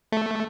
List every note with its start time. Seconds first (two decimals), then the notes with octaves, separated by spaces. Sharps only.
0.12 A3